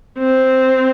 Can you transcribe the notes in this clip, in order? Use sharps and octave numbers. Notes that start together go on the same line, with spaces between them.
C4